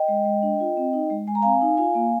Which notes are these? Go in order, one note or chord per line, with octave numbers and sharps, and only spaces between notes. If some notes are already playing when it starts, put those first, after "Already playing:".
Already playing: D#5 G5
G#3
G#3
D4
F4
C4
D#4
G#3
G#3 G#5
A#5
C4 F5 G#5
D#4
F4 F5 G#5
A#3